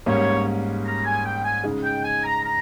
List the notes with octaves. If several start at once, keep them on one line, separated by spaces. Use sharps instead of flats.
G#2 G3 A#3 C#4 C#5
A#5
G#5
G5
G#5
C#3 G#3 D#4
G5
G#5
A#5
A#5